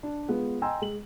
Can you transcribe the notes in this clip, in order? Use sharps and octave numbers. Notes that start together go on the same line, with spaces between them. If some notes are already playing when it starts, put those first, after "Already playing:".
D4
G#3 B3 F4
D#5 G5 G#5 A#5 C6 E6
G#3 F#7